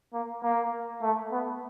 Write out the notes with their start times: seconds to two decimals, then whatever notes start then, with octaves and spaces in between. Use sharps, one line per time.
0.13 A#3
0.43 A#3
1.02 A3
1.32 B3